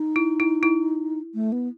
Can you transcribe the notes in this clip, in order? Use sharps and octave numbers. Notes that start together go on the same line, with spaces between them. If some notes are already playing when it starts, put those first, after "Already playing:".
Already playing: D#4
E4
E4
E4
A3
B3